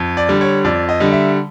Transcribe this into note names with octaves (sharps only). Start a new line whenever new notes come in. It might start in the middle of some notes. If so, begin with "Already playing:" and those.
Already playing: F2
D5
D3 G3
C#5
F2 D5
D#5
D3 G3
E5